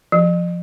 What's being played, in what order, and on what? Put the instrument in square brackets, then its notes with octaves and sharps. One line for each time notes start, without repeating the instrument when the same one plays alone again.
[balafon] F3